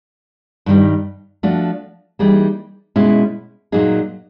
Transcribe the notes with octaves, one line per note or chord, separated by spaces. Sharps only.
G2 D#3 G3
F3 A3 D4 F#4
E3 G3 A#3 D#4 G#4
B2 G#3 C#4 E4
A#2 F#3 A#3 D#4 G#4